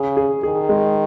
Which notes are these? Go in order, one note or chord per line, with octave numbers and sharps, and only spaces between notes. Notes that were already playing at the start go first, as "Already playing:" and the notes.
Already playing: C#3 G#4
G#4
D#3 G#4
G#3